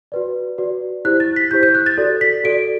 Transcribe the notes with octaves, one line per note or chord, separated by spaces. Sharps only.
F#4 B4 D5
F#4 B4 D5
E4 G4 C5 F#6
A6
B6
E4 G4 C5 G6
G6
F#6
A6
F#4 A4 D5
B6
F#4 A4 D5 D7